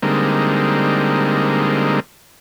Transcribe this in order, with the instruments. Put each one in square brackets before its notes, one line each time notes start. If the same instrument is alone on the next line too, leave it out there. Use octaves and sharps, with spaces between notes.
[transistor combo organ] D3 G3 G#3 A#3 C4 D#4